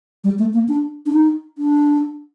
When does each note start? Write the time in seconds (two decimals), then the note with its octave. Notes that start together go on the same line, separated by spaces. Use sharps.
0.24 G3
0.39 A3
0.54 A#3
0.68 D4
1.06 D4
1.13 D#4
1.58 D4